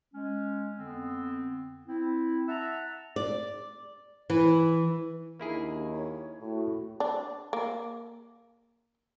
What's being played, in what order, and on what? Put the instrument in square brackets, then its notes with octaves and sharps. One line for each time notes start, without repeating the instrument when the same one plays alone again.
[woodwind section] G#3 C#4
F2 D3 B3 C4
C4 E4
E5 F#5 A5 A#5 E6
[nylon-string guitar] D5
E3
[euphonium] D#2 [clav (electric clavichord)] A#3 E4 G#4 [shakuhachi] D4
[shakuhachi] C#5
[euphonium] A2 [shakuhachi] F#4
[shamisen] D4
A#3